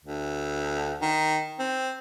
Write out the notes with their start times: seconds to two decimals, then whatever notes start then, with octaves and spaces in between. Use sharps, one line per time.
0.04 D2
1.01 D#3
1.59 C4